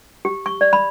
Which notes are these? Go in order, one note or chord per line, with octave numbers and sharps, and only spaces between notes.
G4
C#6
D5
B5